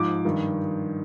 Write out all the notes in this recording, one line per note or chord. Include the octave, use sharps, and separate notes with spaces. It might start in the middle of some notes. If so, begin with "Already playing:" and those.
Already playing: G#2 F3 D6
G2 D#3